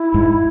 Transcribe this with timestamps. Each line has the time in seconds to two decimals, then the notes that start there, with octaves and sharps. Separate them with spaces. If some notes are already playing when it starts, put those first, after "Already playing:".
Already playing: E4
0.14 G#2